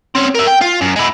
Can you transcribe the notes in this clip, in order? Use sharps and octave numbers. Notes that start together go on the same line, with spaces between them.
C4 C#4
A#4 E5
G5
F4
F#2
G#3 E4